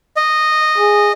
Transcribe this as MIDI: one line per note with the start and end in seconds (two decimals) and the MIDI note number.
0.17 1.12 75
0.78 1.12 68